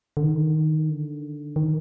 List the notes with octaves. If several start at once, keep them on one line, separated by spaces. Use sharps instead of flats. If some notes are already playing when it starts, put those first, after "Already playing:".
D3
D#3
D3
D#3